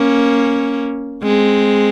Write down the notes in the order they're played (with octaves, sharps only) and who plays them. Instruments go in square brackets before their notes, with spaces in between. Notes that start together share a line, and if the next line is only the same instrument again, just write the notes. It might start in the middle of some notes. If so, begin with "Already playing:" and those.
Already playing: [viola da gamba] A#3 C#4
G#3 C4